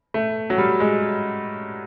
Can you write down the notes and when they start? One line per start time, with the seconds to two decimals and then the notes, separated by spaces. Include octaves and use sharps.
0.14 A3
0.50 F#3
0.58 G3
0.80 G#3